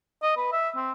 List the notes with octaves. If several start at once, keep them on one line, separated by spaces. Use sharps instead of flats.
D#5
B4
E5
C4